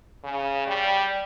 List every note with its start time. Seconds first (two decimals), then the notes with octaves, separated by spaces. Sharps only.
0.24 C#3
0.67 G3